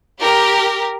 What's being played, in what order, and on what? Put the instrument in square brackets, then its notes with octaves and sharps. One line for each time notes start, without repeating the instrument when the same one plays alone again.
[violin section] G4 A#4